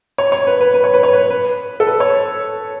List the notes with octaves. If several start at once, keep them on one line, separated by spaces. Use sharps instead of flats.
C#5
C#5
B4
B4
B4
C#5
B4
C#5
B4
B4
A4
B4
C#5